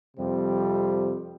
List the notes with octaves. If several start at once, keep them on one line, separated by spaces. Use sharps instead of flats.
F2 C3 G3 C4